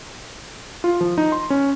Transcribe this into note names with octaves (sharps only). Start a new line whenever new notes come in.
F4
F3
D#4
C6
C#4